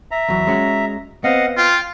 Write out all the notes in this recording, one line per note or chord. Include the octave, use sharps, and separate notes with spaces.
E5 A#5
E2 F#3
G#3 C#4 F#4
B3 C4 D#5 F5 F#5
F4 G5